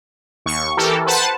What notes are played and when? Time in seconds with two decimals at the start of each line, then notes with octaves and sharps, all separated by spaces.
0.46 D#2 C#6
0.77 E3 G4 A4 A#4
1.06 B4 C5 F#5 A5